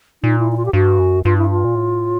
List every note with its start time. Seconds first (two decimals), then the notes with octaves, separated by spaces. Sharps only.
0.23 A#2 D#4
0.40 E4
0.52 E4
0.57 F4
0.66 G4
0.73 G2 F#4
0.99 F#2
1.25 G2 F4
1.37 E4
1.50 F4
1.64 A#2
1.75 A2